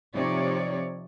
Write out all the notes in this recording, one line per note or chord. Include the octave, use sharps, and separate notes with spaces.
C3 F3 D#4 C#5 D5